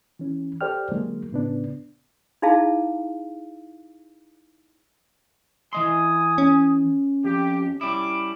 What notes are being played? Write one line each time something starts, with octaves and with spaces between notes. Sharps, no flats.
E3 C#4
G4 A4 C5 D5 G5 F6
D3 F#3 G#3 A#3
A2 C#3 B3 D4
D#4 E4 G#4 F5 A5
E3 D#5 G#5 C6 D#6
C#4
F2 G4
G3 C#4 E4 B5 D6